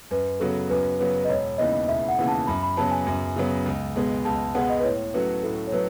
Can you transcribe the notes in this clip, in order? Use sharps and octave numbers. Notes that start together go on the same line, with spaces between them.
F#2 B4
C#3 F#3 B3 F#4 A4
F#2 B4
C#3 F#3 B3 F#4 B4
D#5
E1 C#5
D#2 C#3 E3 B3 D#5
E1 E5
F#5
D#2 C#3 E3 B3
A5
F#2 B5
B5
C#3 F#3 B3 A5
G#5
F#2
C#3 F#3 B3
C#2
B2 G#3 B3
C#2 A5
A5
B2 G#3 B3 F#5
D#5
B4
A2 C#5
F#3 A3 C#4 F#4 B4
A2 A4
C#5
F#3 A3 B4